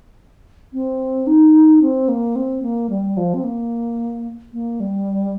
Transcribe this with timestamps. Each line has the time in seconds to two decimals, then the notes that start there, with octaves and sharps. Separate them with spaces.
0.73 C4
1.27 D#4
1.82 C4
2.08 A#3
2.35 C4
2.62 A#3
2.90 G3
3.17 F3
3.34 C4
3.44 A#3
4.53 A#3
4.80 G3